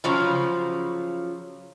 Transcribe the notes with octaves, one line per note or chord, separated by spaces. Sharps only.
C#3 F3 F#3